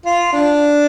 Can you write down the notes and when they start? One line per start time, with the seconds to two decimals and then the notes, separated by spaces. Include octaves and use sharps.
0.06 F4
0.33 D4